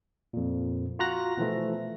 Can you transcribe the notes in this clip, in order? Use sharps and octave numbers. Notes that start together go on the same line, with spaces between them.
F2 A#2
F4 F#4 A#5 F#6 A#6
B2 E3 F3 A3